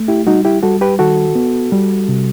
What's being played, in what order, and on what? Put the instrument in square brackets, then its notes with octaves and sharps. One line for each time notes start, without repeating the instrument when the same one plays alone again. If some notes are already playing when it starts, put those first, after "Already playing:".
Already playing: [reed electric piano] A3
E4 G4
G3 D#4 F#4
E4 G4
G3 F#4 A4
G4 B4
D#3 F#4 A4
B3
G3
C3